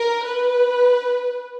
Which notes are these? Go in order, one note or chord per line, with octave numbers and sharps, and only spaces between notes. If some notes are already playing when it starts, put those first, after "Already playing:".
Already playing: A#4
B4